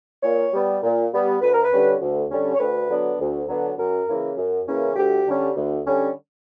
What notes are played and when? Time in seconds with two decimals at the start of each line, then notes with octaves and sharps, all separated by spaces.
0.23 A#2 C#5
0.53 G3 B3
0.83 A#2
1.12 G3 B3
1.41 D2 B4
1.53 A#4
1.63 B4
1.71 D3 G3 C#4
2.01 D2
2.31 D3 G3 C#4
2.55 C#5
2.59 D2 B4
2.90 D3 F#3 B3 D4
3.19 D2
3.48 D3 F#3 B3 D4
3.78 F#2 A#4
4.07 C#3 E3 A#3 C#4
4.37 F#2
4.67 C#3 E3 A#3 C#4
4.96 D2 G4
5.26 D3 G3 C#4
5.56 D2
5.85 D3 G3 C#4